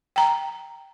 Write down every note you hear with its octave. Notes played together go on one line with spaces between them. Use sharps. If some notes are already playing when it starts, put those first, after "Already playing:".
G5 A#5